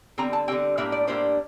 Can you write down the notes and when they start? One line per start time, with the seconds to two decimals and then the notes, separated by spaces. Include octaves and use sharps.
0.18 D3 G3 C4 A#5
0.33 A5
0.48 D3 G3 C4 G5
0.77 A2 G3 A#3 D4 E5
0.92 D5
1.07 A2 G3 A#3 D4 C5